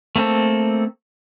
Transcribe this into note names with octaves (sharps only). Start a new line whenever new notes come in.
A3 A#3 C4 A4